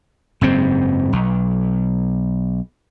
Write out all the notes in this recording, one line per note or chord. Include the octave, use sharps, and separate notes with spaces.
F#1 G#2 C4
B1